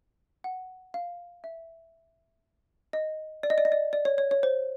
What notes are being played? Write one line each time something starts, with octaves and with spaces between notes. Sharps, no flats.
F#5
F5
E5
D#5
D5
D#5
D5
D#5
D5
D5
C#5
C#5
C#5
C5